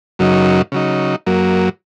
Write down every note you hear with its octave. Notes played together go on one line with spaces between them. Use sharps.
F#2 C#3 F#3 D#4
C#3 F#3 D#4
F#2 F#3 A#3